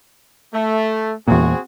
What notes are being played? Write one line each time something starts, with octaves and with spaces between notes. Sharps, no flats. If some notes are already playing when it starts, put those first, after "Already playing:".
A3
E2 A#2 C4 F#4 G#4